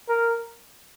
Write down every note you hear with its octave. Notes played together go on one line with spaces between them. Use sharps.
A#4